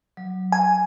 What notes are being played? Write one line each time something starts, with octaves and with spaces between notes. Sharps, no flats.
F#3
G#5